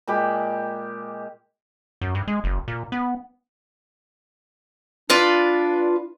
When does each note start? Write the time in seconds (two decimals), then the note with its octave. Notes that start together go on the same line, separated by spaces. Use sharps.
0.07 A#2 G#3 G4 B5
2.01 F#2
2.15 G2
2.28 G#3
2.44 F#1
2.68 A#2
2.92 B3
5.10 D4 F4 B4 D5